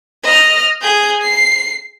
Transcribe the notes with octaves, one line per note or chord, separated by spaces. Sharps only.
D#5 F6
G#4 G6
C7